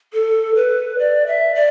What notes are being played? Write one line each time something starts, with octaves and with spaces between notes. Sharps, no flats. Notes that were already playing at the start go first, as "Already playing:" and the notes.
A4
B4
D5
E5
D5